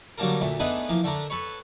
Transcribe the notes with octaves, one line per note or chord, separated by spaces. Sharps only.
D3 F#3 G3 A#3 A4 A#4
D2 A#2 A3
A3 B3 D4 D#4 G#4 B4
E3 F3 A#3
D3 A3 D4 A#4
A4 B4 C#5